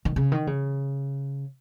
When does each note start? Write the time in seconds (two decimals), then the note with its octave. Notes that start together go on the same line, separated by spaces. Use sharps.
0.05 D#3
0.16 C#3
0.32 D#3
0.47 C#3